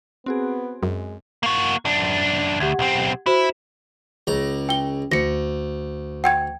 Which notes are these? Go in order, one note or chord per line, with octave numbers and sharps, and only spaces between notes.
B3 C4 F#4 G#4
F#2 G#3
A#3 F#4
F#2 D4
D2 G4 F#5 G#6
B1 C4
E4 F#4 C5 E7
C#2 A#5
G5 G7
D2 A#6 C#7
F#5 G5 G#6